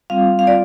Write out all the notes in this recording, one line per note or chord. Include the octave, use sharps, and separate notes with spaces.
G3 C4 F4 F5
F5
G3 C4 F4 D5